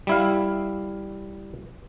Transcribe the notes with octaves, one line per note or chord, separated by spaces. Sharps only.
G3 E4 F5